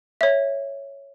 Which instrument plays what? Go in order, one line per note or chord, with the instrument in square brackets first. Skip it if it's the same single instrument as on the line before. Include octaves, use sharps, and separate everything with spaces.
[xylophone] C#5 E5